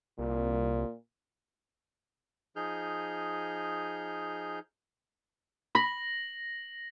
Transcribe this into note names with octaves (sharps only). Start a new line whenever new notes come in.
C2 A#2
F3 D#4 G#4 F6 G6
B5 A#6 F#7